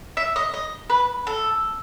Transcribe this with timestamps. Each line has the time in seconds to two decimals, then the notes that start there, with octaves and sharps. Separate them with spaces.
0.17 E5
0.36 D#5
0.54 D#5
0.90 B4
1.27 A4